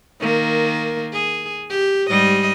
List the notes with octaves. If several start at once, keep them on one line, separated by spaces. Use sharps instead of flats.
D#3 A#3
G#4
G4
G#2 G3 D#5